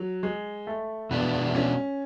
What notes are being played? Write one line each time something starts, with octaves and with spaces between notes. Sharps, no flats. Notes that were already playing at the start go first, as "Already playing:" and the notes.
Already playing: F#3
G#3
A3
B2 G#3 B3 D4 F#4
C#4